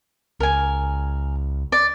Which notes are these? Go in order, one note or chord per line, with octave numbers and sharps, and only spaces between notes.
C#2 A#4 G#5
D5